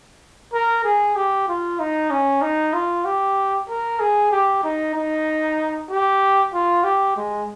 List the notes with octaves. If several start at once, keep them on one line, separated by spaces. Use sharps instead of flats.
A#4
G#4
G4
F4
D#4
C#4
D#4
F4
G4
A#4
G#4
G4
D#4
D#4
G4
F4
G4
G#3